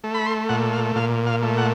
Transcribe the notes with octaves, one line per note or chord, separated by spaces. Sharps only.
A3
B5
C6
A#2 F#5
F5
A#2 F5
F5
A3
F#5